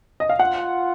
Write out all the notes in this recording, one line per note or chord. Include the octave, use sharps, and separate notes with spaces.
D#5
F5
F4 F#5